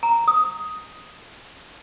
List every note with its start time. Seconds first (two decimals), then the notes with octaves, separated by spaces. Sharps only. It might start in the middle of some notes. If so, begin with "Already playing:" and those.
0.03 A#5
0.28 D#6